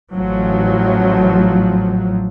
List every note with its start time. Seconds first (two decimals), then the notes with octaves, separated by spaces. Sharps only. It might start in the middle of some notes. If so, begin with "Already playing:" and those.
0.13 A1 F3 F#3